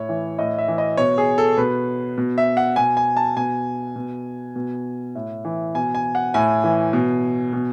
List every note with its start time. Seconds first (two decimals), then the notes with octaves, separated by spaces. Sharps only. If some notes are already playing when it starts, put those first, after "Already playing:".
Already playing: A2 C#5
0.09 E3
0.39 A2 D#5
0.58 E5
0.68 E3
0.78 D#5
0.97 B2 C#5
1.18 G#4
1.38 A4
1.57 B2 B4
2.18 B2
2.38 E5
2.57 F#5
2.76 B2 G#5
2.97 G#5
3.17 A5
3.37 B2 G#5
3.96 B2
4.56 B2
5.15 A2
5.45 E3
5.75 B2 G#5
5.95 G#5
6.15 F#5
6.34 A2 G#5
6.64 E3
6.93 B2
7.53 B2